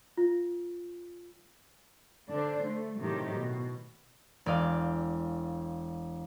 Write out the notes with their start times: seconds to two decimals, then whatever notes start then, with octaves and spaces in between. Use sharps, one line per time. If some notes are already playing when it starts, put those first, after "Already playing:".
0.17 F4
2.29 D3 D4 C5
2.66 A3
2.98 A2 C3 D#3 F#3 G4
3.36 B2
4.46 E1 D5 D#5 F5